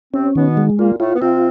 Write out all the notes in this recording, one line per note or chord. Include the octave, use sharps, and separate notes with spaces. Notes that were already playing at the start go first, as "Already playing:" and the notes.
C3 C4 C#4
B2 D#3 B3
G#3
A#2 A#3 F4
A2 A3 F4
B3
C3 C4 F4